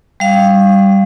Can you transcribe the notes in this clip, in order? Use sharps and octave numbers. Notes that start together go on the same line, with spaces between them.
G3 F5